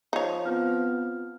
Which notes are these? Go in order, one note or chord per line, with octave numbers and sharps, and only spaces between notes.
F3 D#4 C#5
B3 C4 F4 F6